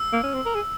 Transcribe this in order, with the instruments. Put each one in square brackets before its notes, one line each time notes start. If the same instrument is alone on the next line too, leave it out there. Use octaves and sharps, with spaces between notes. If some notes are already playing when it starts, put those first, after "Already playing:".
Already playing: [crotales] E6
[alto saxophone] A#3
C#4
C4
A#4
G#4